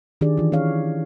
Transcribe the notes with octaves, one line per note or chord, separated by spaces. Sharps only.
D#3 D4 G4 G#4 D5
E3 F4
C#4 G#4 C#5 F5